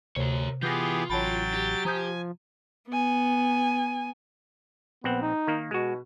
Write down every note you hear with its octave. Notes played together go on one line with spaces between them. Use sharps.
D2 C3 A#4 C#5
E3 B3 F4 G4 G#4 G6 A#6
A1 F#3 C#5 G5 A5 B5 A6
G4
F3 G#5 A#5 D#6 G6
B3 G#5
A#1 B3 C4 F#5
D#4
D#3 A#3
B2 G#3 F#4